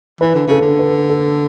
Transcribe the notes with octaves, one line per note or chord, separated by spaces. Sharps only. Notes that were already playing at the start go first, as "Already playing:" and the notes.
E3 B4
D3
C#3 A4
D3
B4
A4